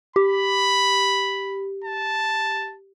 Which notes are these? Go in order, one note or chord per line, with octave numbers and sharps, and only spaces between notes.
G4 B5
A5